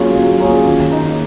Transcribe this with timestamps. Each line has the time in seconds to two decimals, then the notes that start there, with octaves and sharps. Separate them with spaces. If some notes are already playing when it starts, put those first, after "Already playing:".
Already playing: F#3 A#3 C#4 F4 G#4
0.16 F#3
0.40 A#3 C#4 F4 G#4
0.65 D#3
0.90 A#3 D#4